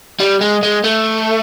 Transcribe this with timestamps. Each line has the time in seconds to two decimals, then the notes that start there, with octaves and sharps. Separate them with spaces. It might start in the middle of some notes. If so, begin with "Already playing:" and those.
0.20 G3
0.41 G#3
0.63 G#3
0.84 A3